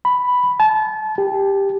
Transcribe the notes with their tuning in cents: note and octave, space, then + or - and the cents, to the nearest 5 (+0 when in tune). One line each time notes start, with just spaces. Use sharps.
B5 +0
A5 -30
G4 +10